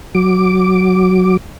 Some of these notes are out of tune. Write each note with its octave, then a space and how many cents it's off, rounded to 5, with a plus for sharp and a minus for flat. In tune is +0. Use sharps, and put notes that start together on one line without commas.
F#3 +0 D6 +0